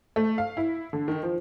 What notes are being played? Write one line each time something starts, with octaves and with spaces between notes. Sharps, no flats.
A3
F5
E4
D3
D#3
F3